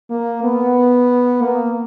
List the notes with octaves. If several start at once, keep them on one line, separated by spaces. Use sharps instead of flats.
A#3
B3
A#3